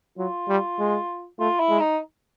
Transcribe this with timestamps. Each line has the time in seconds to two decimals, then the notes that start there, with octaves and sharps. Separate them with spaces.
0.18 F#3 F4
0.49 G3
0.79 G#3
1.39 A3 F4
1.60 E4
1.70 G#3
1.80 D#4